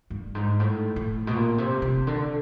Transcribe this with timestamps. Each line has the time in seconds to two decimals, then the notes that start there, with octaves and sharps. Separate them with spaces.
0.10 G2
0.35 G#2
0.60 A2
0.96 A2
1.27 B2
1.33 A#2
1.58 C3
1.82 C3
2.07 D3